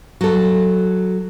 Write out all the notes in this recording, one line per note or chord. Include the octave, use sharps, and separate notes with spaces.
F#3 A4